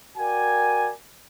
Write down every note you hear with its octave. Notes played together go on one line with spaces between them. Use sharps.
F#4 A#4 D5 G5 G#5